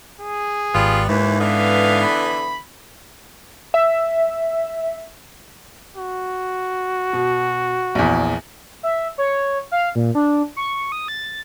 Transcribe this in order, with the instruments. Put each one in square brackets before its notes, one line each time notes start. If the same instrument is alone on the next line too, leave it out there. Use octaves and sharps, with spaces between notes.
[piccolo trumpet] G#4
[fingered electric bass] G#1 [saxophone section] G3 B3 F4
[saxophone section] D#2 E3 [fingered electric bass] G#2
[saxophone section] D3 E3 B3 [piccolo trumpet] F5
[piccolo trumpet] B5
[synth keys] E5
[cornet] F#4
[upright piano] B2
A#1 E2
[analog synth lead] E5
C#5
F5
A#2
D4
C#6
D#6
A6